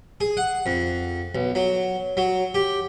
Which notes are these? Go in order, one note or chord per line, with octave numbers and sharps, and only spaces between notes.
G#4
F#5
F2
B1
F#3
F#3
G4